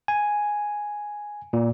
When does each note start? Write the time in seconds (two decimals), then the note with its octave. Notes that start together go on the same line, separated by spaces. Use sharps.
0.08 G#5
1.53 A#2